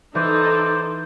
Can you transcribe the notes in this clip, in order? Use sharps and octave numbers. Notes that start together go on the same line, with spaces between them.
E3 D#4 A4 C5 D5